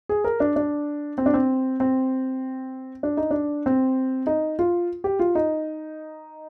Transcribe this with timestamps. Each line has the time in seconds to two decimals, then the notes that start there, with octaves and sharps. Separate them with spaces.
0.09 G#4
0.24 A#4
0.40 D4
0.56 D4
1.18 C4
1.26 D4
1.34 C4
1.80 C4
3.03 D4
3.17 D#4
3.31 D4
3.66 C4
4.27 D#4
4.59 F4
5.04 G4
5.19 F4
5.35 D#4